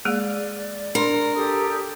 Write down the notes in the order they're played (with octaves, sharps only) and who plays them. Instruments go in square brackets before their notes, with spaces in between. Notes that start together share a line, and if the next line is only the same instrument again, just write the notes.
[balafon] G#3 A#3 G#4 [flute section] D5
[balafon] D4 C6 [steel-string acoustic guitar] A#4
[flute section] G4 A4 D#6